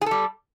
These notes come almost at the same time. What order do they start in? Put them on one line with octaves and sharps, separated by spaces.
G#4 A4 G3